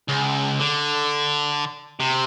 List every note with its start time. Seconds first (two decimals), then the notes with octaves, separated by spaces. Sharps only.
0.08 C#2
0.60 D3
2.00 C3